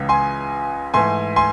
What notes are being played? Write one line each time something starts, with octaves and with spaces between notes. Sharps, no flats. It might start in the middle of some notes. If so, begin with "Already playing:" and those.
Already playing: C#2 C#3 E3 G#3
G#5 C6
G#2 E3 A3 G#5 C6
G#5 C6